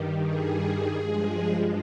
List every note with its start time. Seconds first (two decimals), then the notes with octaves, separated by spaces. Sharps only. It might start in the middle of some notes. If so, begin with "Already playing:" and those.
Already playing: G2 D#3 G3
0.23 G#4
0.95 G2 F3 G#3